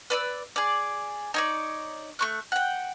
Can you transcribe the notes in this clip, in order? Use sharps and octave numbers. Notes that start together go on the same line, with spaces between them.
B4 D5 E6
G#4 D5
D#4 C#5 D5
A3 C#6 F#6
F#5 G5